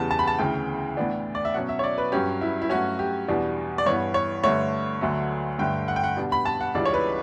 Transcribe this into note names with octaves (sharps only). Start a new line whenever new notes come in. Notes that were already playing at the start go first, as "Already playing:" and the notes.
Already playing: E2 C#3 G3 B3 A5
A5
B5
A5
D2 C#3 E3 G5
A2 E3 B3 D4
D5
E5
B2 F#3 C#4 F#5
E5
C#5
D5
B4
G2 F#3 C#4 G4
E4
E4
G2 F#3 A3 C#4 F#4
G4
E2 B2 G3 D4
D5
G2 E3 B3 C#5
C#5
G2 D3 A3 C#5
D2 D3 F#3 A3
G2 D3 A3 G5
F#5
G5
F#5
B2 G3 B3 D4
B5
A5
F#5
C#2 C#3 E3 G3 D4 D5
C#5
B4